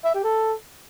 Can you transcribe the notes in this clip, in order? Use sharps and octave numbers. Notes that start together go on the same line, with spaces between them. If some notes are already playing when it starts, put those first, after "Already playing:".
E5
G4
A4